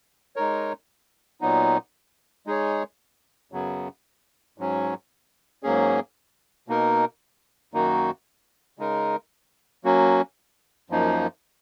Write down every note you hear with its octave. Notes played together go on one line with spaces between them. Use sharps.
G#3 D#4 A#4 C#5
A#2 F#3 B3 D#4
G#3 D#4 G#4 C#5
F#2 C#3 F#3 B3
G#2 F#3 C#4
G#2 F#3 A#3 C#4 G#4
B2 A#3 D#4 A#4
F#2 D#3 A#3 D#4 F#4
C#3 G#3 D#4 A#4
F#3 A#3 C#4 F#4
F#2 F3 A#3 D#4